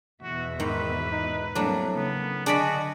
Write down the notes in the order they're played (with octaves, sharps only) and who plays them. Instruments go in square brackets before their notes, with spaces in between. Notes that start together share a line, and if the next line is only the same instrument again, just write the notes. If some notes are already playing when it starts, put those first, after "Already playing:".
[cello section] E2 B2 E5 [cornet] F#4
[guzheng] G#2 [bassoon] D#3 [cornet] B4
[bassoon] D#4
[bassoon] A2 [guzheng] F#3 D4 [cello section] G3 A#3 C4
[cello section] C#3 A#3 [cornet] B3
[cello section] D3 D#5 [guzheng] D4 D5 B5 [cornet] F#4 [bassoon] G#4